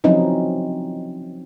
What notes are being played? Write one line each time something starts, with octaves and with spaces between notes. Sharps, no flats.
F3 F#3 C4 C#4 D#4 E4